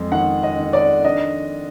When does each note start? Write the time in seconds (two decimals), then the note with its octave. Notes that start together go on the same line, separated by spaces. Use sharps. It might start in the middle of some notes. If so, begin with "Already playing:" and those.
Already playing: F2 G#3
0.12 D#3 F#5
0.43 D#5
0.59 D#3
0.73 D5
1.04 D4 D#5